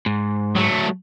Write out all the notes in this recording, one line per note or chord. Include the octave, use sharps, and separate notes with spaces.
G#2
F#3 A3